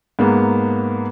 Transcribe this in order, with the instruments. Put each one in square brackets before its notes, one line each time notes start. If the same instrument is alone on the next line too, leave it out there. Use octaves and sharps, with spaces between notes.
[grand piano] G#2 A#3 B3